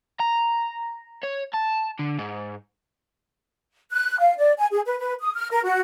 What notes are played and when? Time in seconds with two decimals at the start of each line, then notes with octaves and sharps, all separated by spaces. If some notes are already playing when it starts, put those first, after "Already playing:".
0.20 A#5
1.23 C#5
1.53 A5
1.99 D3
2.18 G#2
3.91 F#6
4.18 F5
4.37 D5
4.58 G#5
4.71 G#4
4.85 B4
4.98 B4
5.21 D#6
5.34 F6
5.51 A#4
5.63 F#4